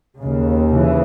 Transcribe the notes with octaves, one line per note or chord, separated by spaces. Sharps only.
D#2 C#3
C#3 E3